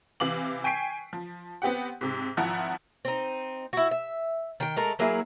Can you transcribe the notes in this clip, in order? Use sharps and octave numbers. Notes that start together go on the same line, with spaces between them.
C3 E3 F5 D6 F#7
G5 G#5 C#6 B6 C7 D7
F3
B3 C4 G4 F#5
G#2 C3
G#1 F3 E4 F#5 A#5
C4 D#4
E4 F#4
E5
D#3 G5
G#3 A3 A#4
F#3 A#3 E4 G#4